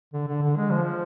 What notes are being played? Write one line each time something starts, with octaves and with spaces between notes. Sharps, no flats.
D3
D3
D3
G#3
F3